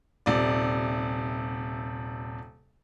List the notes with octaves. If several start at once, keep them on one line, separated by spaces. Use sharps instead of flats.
D#1 C3 D5